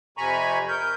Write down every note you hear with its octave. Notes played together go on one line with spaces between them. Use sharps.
F2 C3 G#5 A#5 B5 C#6
A#4 G6